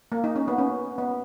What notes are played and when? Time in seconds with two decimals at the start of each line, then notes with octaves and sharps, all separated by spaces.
0.12 A#3
0.24 D#4
0.36 C#4
0.48 B3
0.58 C#4
0.98 B3